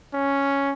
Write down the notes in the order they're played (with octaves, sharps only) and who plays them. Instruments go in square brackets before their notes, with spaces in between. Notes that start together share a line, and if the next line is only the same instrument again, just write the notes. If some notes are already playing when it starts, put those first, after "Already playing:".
[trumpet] C#4